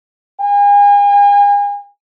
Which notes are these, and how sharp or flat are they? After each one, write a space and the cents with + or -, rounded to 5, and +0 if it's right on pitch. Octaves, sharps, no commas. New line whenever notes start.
G#5 -40